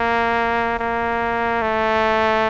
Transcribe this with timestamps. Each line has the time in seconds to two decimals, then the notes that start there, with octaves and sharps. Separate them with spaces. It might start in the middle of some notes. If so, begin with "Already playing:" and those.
Already playing: A#3
0.79 A#3
1.62 A3